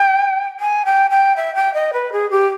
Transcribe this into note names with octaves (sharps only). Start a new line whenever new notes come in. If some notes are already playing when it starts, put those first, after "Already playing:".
Already playing: G5
G#5
G5
G5
E5
G5
D#5
B4
G#4
G4